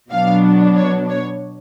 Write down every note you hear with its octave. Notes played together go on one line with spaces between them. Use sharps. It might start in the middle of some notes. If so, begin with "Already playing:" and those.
B2 F#3 B3 D4 F5
C#5
C#5